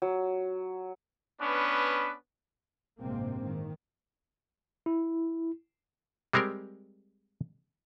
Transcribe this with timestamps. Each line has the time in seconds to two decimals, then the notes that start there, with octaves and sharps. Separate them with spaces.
0.02 F#3
1.41 B3 C#4 D4 B4
3.01 A1 G2 C3 G#3 A#3 C4
3.43 D#3
4.86 E4
6.33 G3 G#3 C4 G4 A#4